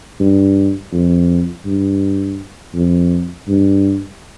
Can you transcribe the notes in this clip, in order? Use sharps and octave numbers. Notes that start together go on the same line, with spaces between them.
G2
F2
G2
F2
G2